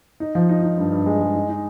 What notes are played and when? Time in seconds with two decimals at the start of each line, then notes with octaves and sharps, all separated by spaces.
0.20 D#4
0.35 F3
0.49 D#4
0.63 D#4
0.78 G2
0.92 G2
1.06 G#3
1.20 G#3
1.35 D#4
1.49 D#4